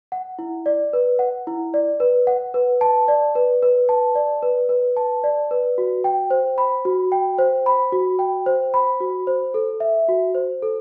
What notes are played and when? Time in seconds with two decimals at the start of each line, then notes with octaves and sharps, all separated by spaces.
0.12 F#5
0.39 E4
0.66 D5
0.93 B4
1.19 F#5
1.47 E4
1.74 D5
2.00 B4
2.27 F#5
2.54 B4
2.81 A5
3.08 D5
3.35 B4
3.63 B4
3.89 A5
4.15 D5
4.43 B4
4.69 B4
4.97 A5
5.24 D5
5.51 B4
5.78 F#4
6.04 G5
6.30 C5
6.58 B5
6.85 F#4
7.12 G5
7.38 C5
7.66 B5
7.93 F#4
8.19 G5
8.46 C5
8.74 B5
9.00 F#4
9.27 C5
9.54 A4
9.80 E5
10.08 F#4
10.35 C5
10.62 A4